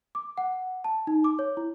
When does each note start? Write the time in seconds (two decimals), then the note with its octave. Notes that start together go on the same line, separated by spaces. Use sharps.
0.15 D6
0.38 F#5
0.84 A5
1.07 D#4
1.24 D6
1.39 C#5
1.57 E4